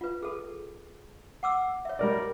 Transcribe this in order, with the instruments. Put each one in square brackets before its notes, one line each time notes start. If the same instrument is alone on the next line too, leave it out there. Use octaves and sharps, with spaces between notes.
[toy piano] F4 B4
G#4 A4
F#5 D6 E6
C#5 E5
[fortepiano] G3 A#4 D5